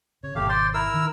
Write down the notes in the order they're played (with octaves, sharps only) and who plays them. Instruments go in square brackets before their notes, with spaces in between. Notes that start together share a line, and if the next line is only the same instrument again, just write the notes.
[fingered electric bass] C#3 [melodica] C#5
[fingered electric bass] G#1 B2 D#3 [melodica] A3 G4 F5
[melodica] C5 D5 C6
E4 A#4 E6
[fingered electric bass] D#3